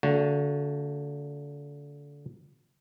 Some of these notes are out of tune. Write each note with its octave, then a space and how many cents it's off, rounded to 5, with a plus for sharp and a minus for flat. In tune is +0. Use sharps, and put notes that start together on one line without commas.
D3 -25 A3 +45 F#4 +0